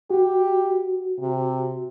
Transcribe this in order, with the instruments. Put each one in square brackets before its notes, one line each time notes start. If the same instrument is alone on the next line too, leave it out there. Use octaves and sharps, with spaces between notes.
[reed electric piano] F#4 [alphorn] G4
[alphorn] C3